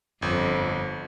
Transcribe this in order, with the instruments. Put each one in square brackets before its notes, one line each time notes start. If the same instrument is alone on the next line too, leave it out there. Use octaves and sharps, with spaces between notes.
[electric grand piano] G1 [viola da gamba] F2